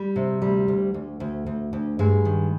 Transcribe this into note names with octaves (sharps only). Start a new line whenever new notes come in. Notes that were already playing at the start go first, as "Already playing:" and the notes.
Already playing: G3
C3
D2 G3
D2
D2
D2
D2
D2
G2 G#3
D#3